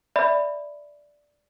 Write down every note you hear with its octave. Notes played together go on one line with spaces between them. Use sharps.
D5 E5 B5